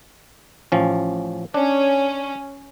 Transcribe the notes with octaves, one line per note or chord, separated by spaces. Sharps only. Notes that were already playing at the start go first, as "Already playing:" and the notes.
A1 F3 C#4
C#4 D4